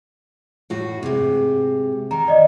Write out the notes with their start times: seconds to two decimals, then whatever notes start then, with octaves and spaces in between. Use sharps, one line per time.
0.70 A2 F#4
1.03 G#2 C3
2.11 D#3 A#5
2.28 D5 D#5